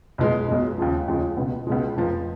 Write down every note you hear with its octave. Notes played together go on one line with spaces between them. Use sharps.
B1 B2 G#3
B1 B2 G#3
D#2 C#3 F3 G#3
D#2 C#3 F3 G#3
C#2 B2 G#3
C#2 B2 G#3
F1 F2 F3